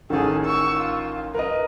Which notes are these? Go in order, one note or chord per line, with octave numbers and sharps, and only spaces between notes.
A1 D#3 G#4 A4
C#6 E6
F4
A#4 B4 D#5